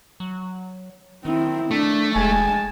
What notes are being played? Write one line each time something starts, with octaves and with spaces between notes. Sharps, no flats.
F#3
D#3 C4 E4
A3 D4
E1 G#3 G#5 A5